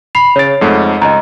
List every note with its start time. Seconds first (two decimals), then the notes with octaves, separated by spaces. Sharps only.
0.15 B5 C7 F7
0.36 C#3 C#5 A6 D7
0.61 F2 G#2 A3
1.01 C#2 D#5 A#5